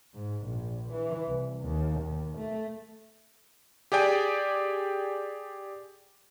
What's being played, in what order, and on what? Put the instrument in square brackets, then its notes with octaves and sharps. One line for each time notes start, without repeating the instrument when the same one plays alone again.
[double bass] G#2
A#1
E3
C2
D#2
D#2
A3
[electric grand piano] G4 G#4 D5 G5 G#5